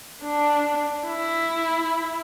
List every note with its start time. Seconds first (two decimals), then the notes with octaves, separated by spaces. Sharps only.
0.22 D4
1.06 E4